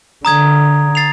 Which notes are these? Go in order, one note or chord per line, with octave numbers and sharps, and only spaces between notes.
D3 A#5 D#6 G#6
A6 C7 F7